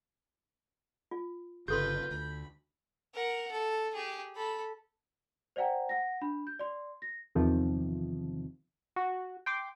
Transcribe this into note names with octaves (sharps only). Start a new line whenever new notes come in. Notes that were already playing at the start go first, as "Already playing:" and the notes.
F4
G1 C#3 F4 G4 A4 B4 C6 G6
D2 B5
A#4 F#5
A4
G4 G#4
A4 B5
C5 D5 E5 F#5 G5 A#5
F#5 A#6
D4 B5
G6
D5 C6
A#6
E2 C3 D#3 F3
F#4
G5 C6 D6